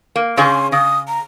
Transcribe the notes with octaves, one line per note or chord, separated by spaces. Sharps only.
A#3
C#3 C#4 G#4 C6
C#3 D#6
A#5